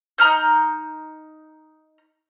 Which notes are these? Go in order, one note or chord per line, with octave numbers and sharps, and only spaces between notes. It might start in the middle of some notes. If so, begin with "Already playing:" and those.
D#4 A#5 F6 G6